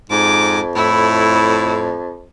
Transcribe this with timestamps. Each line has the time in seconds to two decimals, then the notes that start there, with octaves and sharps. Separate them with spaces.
0.10 F2 G#2 D6
0.75 A2 E4